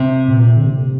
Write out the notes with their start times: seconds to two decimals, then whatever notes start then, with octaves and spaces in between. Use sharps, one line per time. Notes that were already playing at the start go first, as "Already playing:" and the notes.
Already playing: C3
0.28 A#2
0.57 D3
0.66 C3